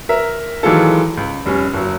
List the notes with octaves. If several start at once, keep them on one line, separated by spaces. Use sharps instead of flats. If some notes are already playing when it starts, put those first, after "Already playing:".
A#4 E5
D#3 E3 F#3 G#3 F4 A4
C#2
F1 G3 C#4
F#1 F#3